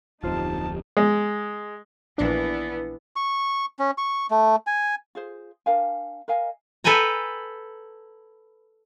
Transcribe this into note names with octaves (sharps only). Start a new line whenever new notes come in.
D1 F2 D#4 F4 G4 C5 A5
G#3
A#1 E3 B3 D4
C#6
C#4
C#6
A3
G#5
F4 G#4 C5
D4 A#4 F5 G#5
A#4 D#5 F5 G#5
A4 B4 G5 G#5 A#5